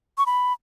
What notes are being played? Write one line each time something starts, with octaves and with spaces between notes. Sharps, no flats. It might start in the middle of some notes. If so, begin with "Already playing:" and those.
C#6
B5